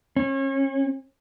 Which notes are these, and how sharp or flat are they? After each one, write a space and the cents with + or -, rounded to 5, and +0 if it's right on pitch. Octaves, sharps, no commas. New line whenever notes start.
C#4 -35